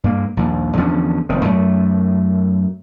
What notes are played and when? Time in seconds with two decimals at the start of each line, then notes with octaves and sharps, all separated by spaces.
0.04 G2 A#3
0.37 A#1 D#2
0.77 E2 D3 F3 C#4
1.29 F1 D#3 C4
1.45 F#2 A3